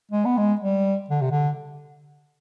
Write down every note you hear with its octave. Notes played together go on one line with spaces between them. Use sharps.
G#3
B3
G#3
G3
D3
C3
D3